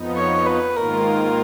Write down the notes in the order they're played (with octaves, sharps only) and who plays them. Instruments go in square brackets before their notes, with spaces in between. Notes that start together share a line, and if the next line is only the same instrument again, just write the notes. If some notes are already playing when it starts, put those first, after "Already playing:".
Already playing: [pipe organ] F2 F3 B3 D#4
[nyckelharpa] C#5
B4
[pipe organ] G#2 D#3 A#3 F4 [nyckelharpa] A#4